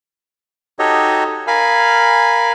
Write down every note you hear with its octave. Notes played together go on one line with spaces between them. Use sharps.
D#4 F#4 G4 A4 C#5 D#5
A#4 F5 G#5 B5